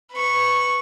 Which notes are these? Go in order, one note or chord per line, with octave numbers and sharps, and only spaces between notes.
B4 C#6